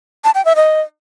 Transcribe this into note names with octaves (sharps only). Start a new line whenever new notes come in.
A5
G5
E5
D#5